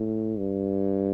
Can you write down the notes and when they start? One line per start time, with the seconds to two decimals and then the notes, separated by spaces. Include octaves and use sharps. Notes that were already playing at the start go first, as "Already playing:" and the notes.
Already playing: A2
0.38 G2